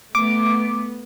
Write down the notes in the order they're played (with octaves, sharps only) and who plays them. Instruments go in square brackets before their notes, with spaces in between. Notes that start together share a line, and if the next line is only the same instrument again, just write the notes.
[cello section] A3 B3 [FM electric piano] D6